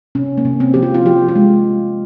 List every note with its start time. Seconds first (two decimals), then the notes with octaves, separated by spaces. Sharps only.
0.15 C3 C#4
0.38 A#3
0.45 C3
0.60 C4
0.74 F3 G4
0.83 F4
0.94 F4
1.05 F3 G4
1.28 F4
1.36 G#3